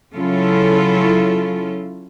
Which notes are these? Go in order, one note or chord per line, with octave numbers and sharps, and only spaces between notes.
C#3 F#3 C#4 E4 F4 A4